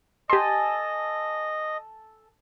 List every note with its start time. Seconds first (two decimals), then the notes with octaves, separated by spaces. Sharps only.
0.30 G4 A4 D#5 G#5 C6